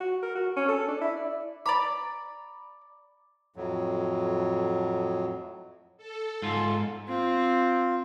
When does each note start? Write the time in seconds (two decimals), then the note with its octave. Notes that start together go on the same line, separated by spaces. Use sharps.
0.01 F#4
0.23 A#4
0.35 F#4
0.56 C#4
0.68 A4
0.88 D4
1.01 E4
1.17 D5
1.66 D5 A#5 B5 D6
3.56 F2 A2 F#3
5.97 A4
6.42 G#2 F4
7.08 C4 F4